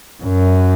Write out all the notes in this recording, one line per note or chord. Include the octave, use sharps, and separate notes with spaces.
F#2